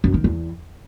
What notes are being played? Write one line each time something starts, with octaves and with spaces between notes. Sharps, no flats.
F#2
D#3
E2